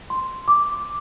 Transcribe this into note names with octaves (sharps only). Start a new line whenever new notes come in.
C6
D6